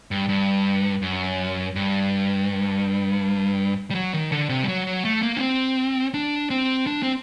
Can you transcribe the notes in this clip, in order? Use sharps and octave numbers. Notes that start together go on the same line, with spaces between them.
G2
G2
F#2
G2
G3
F#3
D#3
D3
C3
G3
F#3
F#3
A3
A#3
D4
C4
D4
C4
D4
C4